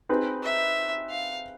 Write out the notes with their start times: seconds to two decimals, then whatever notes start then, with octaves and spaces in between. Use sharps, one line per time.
0.09 C4 D#4 G#4 B4
0.43 E5
1.10 F5